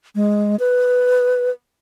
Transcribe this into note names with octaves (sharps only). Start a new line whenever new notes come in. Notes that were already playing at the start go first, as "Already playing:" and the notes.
G#3
B4